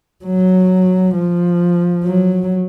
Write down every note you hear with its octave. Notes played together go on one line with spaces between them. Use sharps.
F#3
F3
F#3